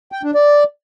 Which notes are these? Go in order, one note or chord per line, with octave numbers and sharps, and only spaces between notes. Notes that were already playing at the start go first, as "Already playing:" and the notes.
G5
D4
D5